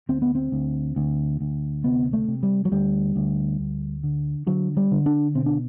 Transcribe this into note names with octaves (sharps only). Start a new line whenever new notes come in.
D2 C4
B3
C4
D2
D2
D2
C3 B3
A3
C3
G3
F#3
D2 G3
D2
D2
D3
D3 F#3
G3
D3
D4
B2 C4
D4